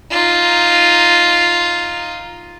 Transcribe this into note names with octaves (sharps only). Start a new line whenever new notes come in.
D#4 F4